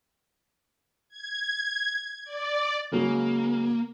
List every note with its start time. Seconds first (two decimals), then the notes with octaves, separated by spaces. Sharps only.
1.09 G#6
2.25 D5
2.92 C#3 F#3 G#3 A#3